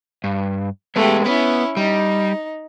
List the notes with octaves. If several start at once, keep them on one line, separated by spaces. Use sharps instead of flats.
G2
G#3 A3 B3 G4
B3 C#4 E4
G3 D#4